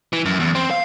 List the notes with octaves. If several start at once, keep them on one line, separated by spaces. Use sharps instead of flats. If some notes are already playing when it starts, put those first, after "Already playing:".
E3
F#2
E2
C4
F5